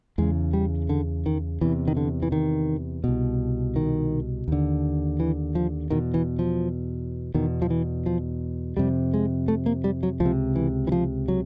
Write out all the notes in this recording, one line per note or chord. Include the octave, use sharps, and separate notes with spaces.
E2 C#3 G#3
G3
D3
D#3
E2 C3 E3
D#3
D3
E3
D#3
C2 B2
D#3
D#2 D3
E3
F3
E2 B2 D#3
E3
F3
E2 B2 D#3
F3
E3
F3
F2 C3 G3
G#3
A3
A#3
G3
F#3
C#2 F3
C3
E3
E3
F3
F#3